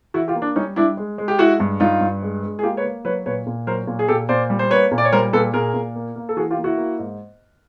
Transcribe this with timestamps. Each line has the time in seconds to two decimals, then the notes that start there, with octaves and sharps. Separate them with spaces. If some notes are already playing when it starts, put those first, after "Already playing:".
0.14 E3 E4 F#4
0.28 F4 G4
0.35 A#3
0.42 D4
0.56 G3 C#4 D#4
0.76 G3 D4 E4
0.97 G#3
1.18 G#3
1.28 G4
1.39 G#3 E4 F#4
1.60 G2
1.80 G2 D#4 F4
2.01 G2
2.22 G#3
2.43 G#3
2.59 G#4
2.63 A#3 F4 G4
2.77 B4 C#5
2.84 A#3
3.05 F#3 B4 C#5
3.26 A#2 B4 C#5
3.46 A#2
3.67 F#3 A#4 C5
3.87 A#2
3.99 G#4
4.08 A#2 G4 A4
4.29 A#2 C5 D5
4.50 G3
4.59 C5
4.71 A#3 B4 C#5
4.91 A#2
4.98 D5
5.05 C#5
5.12 G3 A#4 C5
5.33 A#2 A4 B4
5.53 A#2 G#4 A#4
5.74 A#2
5.96 A#3
6.16 A#3
6.29 A4
6.37 E3 F#4 G#4
6.51 F4 G4
6.57 A#3
6.64 E4 F#4
6.78 A#3
6.99 G#2